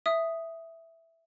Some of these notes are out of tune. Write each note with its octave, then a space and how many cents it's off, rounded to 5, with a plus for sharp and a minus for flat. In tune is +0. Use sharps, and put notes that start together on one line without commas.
E5 +0 D#6 +0